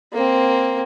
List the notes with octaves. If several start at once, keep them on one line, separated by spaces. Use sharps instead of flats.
A#3 C4